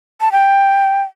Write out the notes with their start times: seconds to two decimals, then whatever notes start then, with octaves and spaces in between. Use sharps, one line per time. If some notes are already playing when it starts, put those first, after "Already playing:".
0.21 A5
0.32 G5